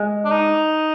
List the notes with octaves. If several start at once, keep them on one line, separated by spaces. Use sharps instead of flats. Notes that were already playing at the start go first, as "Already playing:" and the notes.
Already playing: G#3
D4
D#4